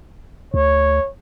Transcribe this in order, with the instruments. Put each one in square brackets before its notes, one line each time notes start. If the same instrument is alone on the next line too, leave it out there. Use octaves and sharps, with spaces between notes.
[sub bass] D2 [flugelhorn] C#5